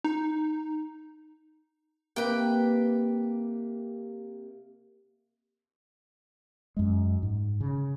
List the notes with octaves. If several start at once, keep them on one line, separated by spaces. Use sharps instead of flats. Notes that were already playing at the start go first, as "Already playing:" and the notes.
D#4
C3 A#3 B4 G5
F#2 G#3
G#2
C#3